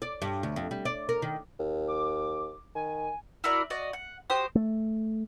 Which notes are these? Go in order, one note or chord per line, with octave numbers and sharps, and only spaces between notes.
D5
G2
D2
F2
G3
D5
A#4
D#3
D#2
D6
D#3 G#5
E4 F#4 A#4 D5
F#4 D5 D#5
F#5
F#4 G4 C5 D#6
A3